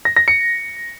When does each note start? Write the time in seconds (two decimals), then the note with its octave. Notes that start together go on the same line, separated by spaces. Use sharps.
0.05 A#6
0.16 A#6
0.28 C#7